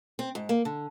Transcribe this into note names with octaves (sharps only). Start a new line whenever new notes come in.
C4
G#2
A#3
D3